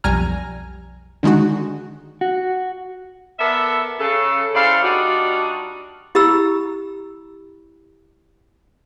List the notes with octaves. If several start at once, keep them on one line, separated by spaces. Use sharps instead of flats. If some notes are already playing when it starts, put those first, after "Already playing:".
B1 F2 G3 G#5 A#5 F6
D3 D#3 G#3 D#4 F#4
F#4
B3 A4 A#4 D5 E5
C#3 A4
C#3 E4 A4 C5 D5 F5
G3 D4 D#4 F4 F#4
E4 G4 A#5 B5 E6